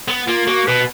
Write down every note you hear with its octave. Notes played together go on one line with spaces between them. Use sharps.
B3
A#3 F4
A#3 F#4
B2 B4